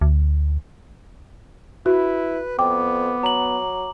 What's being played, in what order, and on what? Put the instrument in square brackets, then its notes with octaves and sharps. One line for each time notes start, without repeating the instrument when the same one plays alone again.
[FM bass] D2
[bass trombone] E4 [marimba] F#4 [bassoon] B4
[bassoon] F2 [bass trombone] B3 [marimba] G5 [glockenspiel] D6
[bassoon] F#3 [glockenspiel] A#5 F#7